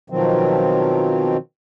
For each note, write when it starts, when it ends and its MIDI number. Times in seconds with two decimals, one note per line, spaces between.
0.10 1.37 47
0.10 1.37 51
0.10 1.37 53
0.10 1.37 54
0.10 1.37 60